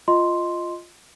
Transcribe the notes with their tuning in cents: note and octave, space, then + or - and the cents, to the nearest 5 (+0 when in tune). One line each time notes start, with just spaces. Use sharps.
F4 +0 D#5 +0 C6 +0